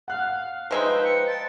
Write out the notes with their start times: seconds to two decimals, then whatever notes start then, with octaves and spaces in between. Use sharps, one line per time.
0.08 F5 F#5 F#6
0.71 F3 G#3 D#4 B4 C5 E5 G5
1.05 C#7
1.27 G5 A5 A6